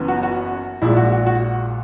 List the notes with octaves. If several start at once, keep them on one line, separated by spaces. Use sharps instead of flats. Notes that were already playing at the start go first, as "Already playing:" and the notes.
Already playing: F#1 F#2 E3 B3
F#4
F#4
A#1 A#2 G#3 E4
F#4
F#4
F#4